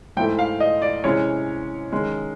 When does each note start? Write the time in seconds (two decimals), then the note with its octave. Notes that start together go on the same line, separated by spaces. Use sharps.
0.17 G#2 E3 A3 G5
0.39 F5
0.60 D#5
0.82 D5
1.04 C3 E3 G#3 C#4 C#5
1.92 D#3 G#3 C#4